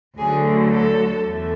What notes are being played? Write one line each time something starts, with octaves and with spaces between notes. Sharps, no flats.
D2 D3 F#3 A3 G#4
A4
E2 D3 A3